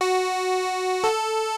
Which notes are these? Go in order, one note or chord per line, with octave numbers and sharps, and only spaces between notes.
F#4
A4